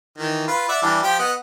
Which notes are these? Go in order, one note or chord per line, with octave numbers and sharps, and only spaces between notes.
D#3 E3
F4 B4
D5 E5 F#5
E3 G3 D4
F3 G4 G5
B3 D#5 F#5